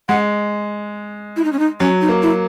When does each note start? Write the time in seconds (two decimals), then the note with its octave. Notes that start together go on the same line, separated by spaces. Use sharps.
0.09 G#3 F#5
1.37 E4
1.44 D#4
1.53 C#4
1.59 D#4
1.80 F#3 C#4
2.01 D#4
2.09 A#3
2.22 E4